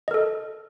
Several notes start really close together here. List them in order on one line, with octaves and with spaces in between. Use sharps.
D#5 A#4 A4